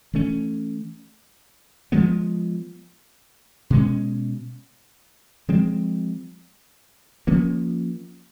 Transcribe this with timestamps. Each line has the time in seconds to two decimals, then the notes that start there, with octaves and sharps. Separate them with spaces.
0.14 E3 A3 C#4
1.92 F3 G#3 B3
3.70 B2 G#3 C#4
5.48 F3 G#3 C4
7.27 F3 A#3 C#4